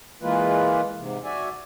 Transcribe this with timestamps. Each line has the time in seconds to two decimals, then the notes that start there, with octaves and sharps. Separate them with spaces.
0.22 E3 G#3 A#3 F4 B4
0.99 G#2 C3
1.24 F#4 D5 E5 G#5